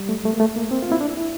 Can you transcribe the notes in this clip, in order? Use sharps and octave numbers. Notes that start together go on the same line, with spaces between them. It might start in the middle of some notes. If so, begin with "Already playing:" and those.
Already playing: G3
A3
A3
A#3
A3
A#3
C4
F4
E4
D4
E4